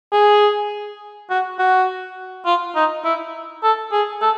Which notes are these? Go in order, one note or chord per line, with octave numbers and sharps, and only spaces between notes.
G#4
F#4
F#4
F4
D#4
E4
A4
G#4
A4